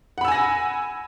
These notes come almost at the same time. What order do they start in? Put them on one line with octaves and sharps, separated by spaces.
F#5 B5 E6 G#5 A#6